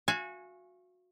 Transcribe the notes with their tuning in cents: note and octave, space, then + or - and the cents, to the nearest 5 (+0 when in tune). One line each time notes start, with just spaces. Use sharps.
F#4 -25 F5 -40 G#5 +0